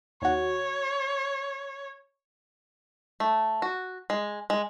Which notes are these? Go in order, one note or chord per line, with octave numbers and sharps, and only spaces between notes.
D#2 F#4 C#5
A3
F#4
G#3
G#3